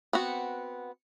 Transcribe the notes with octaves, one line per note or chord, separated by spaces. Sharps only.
B3 C4 F#4